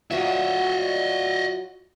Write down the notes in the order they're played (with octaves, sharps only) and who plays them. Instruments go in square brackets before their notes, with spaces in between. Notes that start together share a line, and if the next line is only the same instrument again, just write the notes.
[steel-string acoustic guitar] F#3 F4 F#4 [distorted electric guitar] D#5 E5